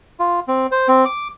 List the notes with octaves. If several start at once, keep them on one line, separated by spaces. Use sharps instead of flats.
F4
C4
C5
C4
D6